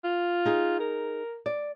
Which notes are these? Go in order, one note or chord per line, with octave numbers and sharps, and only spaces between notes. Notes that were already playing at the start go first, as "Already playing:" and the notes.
F4
D#4 G#4
A#4
D5